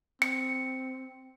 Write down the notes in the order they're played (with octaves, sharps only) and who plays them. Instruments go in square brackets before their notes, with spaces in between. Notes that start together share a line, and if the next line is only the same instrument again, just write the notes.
[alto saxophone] C4 [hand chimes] C#7